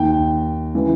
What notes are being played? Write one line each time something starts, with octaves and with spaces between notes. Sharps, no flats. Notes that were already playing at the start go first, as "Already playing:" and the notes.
Already playing: D#2 D#3 G5
C#3 E3